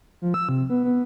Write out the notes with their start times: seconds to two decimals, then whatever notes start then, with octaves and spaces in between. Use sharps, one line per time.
0.22 F3
0.34 E6
0.49 C3
0.70 B3
0.84 B3